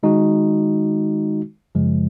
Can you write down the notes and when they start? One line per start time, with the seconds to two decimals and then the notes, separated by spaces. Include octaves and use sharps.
0.03 D#3 G#3 D#4 F#4
1.75 F#2 C#3 F3 G#3